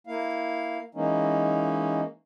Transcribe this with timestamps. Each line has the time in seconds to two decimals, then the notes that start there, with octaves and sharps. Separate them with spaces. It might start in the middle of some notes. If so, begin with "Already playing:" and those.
0.07 A#3 E4 F5
0.95 E3 G#3 A#3 C#4 D#4